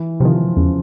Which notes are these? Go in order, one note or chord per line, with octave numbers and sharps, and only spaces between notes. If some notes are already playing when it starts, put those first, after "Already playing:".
Already playing: E3
C3 D#3 F3
E2 C#3